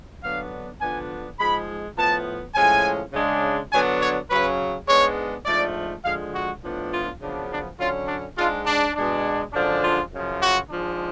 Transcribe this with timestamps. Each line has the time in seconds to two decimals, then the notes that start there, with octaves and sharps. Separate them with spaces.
0.23 D3 F#3 B3 D4 F5
0.80 D3 F3 B3 D4 G#5
1.39 G#2 F3 G#3 B5
1.97 A2 F3 B3 A5
2.55 A2 F3 G#3 C#4 G#5
3.13 C#3 G#3 D4
3.72 D3 F#3 B3 D4 G#5
4.00 C#5
4.30 C#3 F#3 C#4 B4
4.88 G#2 G#3 B3 D4 C#5
5.46 G#2 F3 A3 D4 D5
6.04 D3 F3 G#3 F5
6.34 F#4
6.63 A2 F3 B3 D4
6.92 F4
7.21 F#2 C#3 F3 B3 D4
7.50 D4
7.79 D3 F#3 C#4 F4
8.08 D4
8.37 G#2 G#3 D4 F4
8.66 D4
8.95 B2 G#3 D4
9.53 F#2 D3 F3 G#3 D4
9.82 F4
10.12 F#2 C#3 F3
10.41 F#4
10.70 G#2 F3 G#3 D4